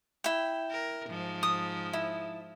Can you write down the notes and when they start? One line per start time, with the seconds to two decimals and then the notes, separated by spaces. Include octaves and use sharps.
0.24 E4 G5
0.71 A#4
1.07 G#2 F3
1.43 D#6
1.93 E4